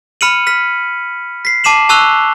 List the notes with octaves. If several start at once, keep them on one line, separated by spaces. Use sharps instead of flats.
B5 F6 C#7 D#7 F#7
F6 B6
B6 C7
A5 D6 C7 E7 F#7
A5 C#6 E6 F#6 F7 G7